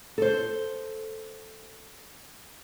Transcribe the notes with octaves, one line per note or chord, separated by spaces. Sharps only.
A4 C5